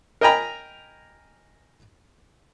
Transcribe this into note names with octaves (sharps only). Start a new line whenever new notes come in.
A#4 D#5 G5 G#5 A#5 B5